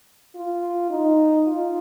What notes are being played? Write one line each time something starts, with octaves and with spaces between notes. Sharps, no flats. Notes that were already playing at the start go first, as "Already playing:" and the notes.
F4
D#4
F4